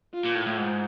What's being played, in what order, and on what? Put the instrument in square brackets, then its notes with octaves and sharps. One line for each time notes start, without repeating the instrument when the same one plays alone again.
[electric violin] F4
[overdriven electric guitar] A#2
A2
A2
G#2